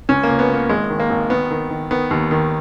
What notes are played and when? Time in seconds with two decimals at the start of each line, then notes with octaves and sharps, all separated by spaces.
0.09 C#2 C#4
0.23 A#3
0.29 C#2
0.39 B3
0.49 C#2 A#3
0.69 G#1 G#3
0.90 D#3
1.00 A#3
1.10 G#1
1.30 D#3 B3
1.51 D#3
1.70 D#3
1.91 D#3 B3
2.11 D#2
2.31 D#3